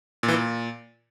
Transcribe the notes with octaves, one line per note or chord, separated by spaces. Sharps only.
A#2
E3
A#2